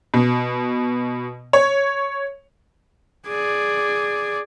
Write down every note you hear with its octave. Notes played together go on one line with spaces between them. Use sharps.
B2
C#5
G#4 D5